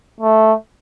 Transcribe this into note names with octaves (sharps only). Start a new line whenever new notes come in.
A3